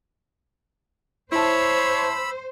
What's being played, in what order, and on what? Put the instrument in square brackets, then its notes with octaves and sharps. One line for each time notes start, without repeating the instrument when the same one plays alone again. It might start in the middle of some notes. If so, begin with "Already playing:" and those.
[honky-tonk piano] E4 A5 [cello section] C5 [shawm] C#5 [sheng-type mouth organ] B5 E6